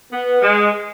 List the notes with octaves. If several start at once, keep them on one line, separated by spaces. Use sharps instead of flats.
B3
G#3